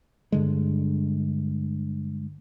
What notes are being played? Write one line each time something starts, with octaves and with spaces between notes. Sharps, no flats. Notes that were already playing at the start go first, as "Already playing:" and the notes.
G2 D3 G#3